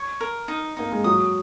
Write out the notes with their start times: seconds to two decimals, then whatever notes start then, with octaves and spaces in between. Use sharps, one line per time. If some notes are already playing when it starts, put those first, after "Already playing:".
Already playing: C#5
0.21 A#4
0.48 D#4
0.77 A#3 D#4
0.91 G#3
1.04 F#3 D#6